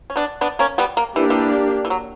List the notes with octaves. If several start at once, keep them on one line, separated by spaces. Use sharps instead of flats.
C#4
B3 D4
B3 D4
A#3 C#4
G3 B3
A#3
E3 A#3 D4 G4
E3
E3
F#3